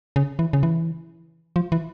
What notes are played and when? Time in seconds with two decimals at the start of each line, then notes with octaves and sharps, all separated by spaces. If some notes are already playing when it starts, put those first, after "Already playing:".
0.16 C#3
0.39 E3
0.53 C#3
0.63 E3
1.56 F3
1.72 E3